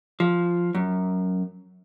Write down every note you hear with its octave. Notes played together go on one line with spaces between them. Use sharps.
F3
F#2